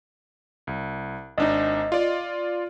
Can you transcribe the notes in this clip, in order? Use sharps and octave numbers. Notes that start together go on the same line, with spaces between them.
C2
G#1 D4 D#4 D#5
F4 D5